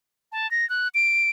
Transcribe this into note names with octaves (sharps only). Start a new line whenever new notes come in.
A5
A#6
F#6
D7